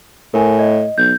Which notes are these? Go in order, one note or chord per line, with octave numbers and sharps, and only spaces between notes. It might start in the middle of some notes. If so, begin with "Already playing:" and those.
A2 A#4 G#5
D#5
B1 G6